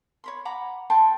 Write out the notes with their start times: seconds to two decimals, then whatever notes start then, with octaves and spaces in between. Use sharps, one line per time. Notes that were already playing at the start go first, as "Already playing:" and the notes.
0.24 C#5 B5 C6
0.45 F#5 A#5 B5 D6
0.90 A4 G5 A5 C6